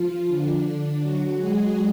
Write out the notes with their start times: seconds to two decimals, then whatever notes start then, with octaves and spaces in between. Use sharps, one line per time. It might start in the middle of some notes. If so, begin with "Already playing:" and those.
Already playing: F3 F4
0.28 D3 D4
1.00 F#3 F#4
1.37 G#3 G#4